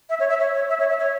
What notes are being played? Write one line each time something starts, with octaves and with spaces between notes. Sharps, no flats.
E5
C#5
E5
C#5
C#5
E5
C#5
E5
C#5